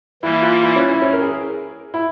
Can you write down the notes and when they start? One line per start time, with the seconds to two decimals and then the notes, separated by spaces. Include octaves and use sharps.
0.22 E3 G3 A#3 E4
0.42 F4
0.63 E4
0.76 C#4
0.89 E4
1.02 C#4
1.13 A#4
1.22 G#4
1.94 E4